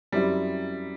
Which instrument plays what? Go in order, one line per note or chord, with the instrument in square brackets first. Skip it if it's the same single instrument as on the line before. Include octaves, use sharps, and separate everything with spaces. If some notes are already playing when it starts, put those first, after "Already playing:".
[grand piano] F#2 F#3 C4 E4 [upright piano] G3